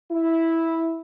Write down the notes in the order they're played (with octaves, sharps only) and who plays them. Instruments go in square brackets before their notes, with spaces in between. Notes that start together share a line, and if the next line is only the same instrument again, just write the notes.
[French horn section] E4